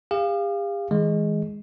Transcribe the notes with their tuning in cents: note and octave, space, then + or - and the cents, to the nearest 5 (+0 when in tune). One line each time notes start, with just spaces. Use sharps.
G4 +45 F5 -5
E3 -40 G#3 +0